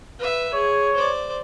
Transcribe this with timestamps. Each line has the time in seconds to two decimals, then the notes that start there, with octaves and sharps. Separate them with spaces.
0.19 B4 E5
0.53 G#4 C#5
0.96 C5 D5